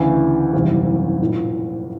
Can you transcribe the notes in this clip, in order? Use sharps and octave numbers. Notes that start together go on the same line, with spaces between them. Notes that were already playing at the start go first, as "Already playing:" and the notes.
Already playing: D2 C#3 E3
F#1 E2 C3 D#3 G3
A#1 A2 F3 A#3 D#4